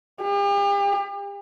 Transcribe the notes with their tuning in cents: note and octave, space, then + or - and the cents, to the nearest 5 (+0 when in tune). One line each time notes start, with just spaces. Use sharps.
G4 +40